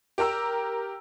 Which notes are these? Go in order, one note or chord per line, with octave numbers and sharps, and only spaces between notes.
G4 A#4 A#5 E6